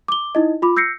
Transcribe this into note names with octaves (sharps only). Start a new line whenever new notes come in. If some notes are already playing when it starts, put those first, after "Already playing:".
D6 G7
D#4 E4 D#5
F4 B5 D6
E6 G6 A#6 C7 C#7